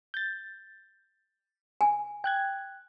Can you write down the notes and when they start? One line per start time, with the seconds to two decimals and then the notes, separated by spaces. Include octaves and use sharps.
0.14 G6 A6
1.81 G#5
2.24 G5 F#6 G#6